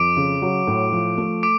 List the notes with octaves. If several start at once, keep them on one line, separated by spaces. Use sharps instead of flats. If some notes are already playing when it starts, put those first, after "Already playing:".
Already playing: F2 D6 D7
C#3
F#3
A2
F3
A3
D6 D7